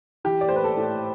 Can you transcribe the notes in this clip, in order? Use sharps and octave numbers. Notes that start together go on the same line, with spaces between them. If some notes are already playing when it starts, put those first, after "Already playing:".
E3 G4
D5
A2 C5
B4
A4
A2